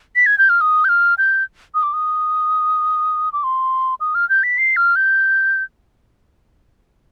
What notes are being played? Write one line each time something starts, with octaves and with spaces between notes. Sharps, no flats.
B6
G#6
G6
F6
D#6
G6
F6
G6
D#6
D6
D#6
D6
C6
D#6
F6
G6
B6
C7
F6
G6